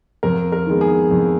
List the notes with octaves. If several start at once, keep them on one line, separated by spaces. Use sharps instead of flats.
F2 A#4
A#4
D#3 G#3 B3
G#4
F2